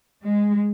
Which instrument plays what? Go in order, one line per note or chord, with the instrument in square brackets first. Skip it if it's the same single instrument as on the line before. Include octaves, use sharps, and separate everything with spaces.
[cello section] G#3